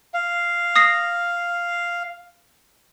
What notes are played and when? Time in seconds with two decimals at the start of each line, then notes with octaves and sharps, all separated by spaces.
0.14 F5
0.76 D#6 A#6 C7